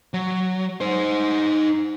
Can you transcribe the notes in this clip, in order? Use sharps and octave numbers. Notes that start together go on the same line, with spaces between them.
F#3
D#4 C5